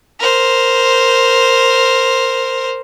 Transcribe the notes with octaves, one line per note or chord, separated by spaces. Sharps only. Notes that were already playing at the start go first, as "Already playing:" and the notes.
A#4 C5